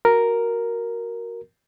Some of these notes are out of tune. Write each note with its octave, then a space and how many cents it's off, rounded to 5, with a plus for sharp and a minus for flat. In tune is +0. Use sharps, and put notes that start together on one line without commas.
F#4 +0 A#4 +0